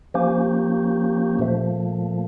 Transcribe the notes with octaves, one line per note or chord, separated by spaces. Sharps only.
F3 A#3 C#4 G4
A#2 F3 A3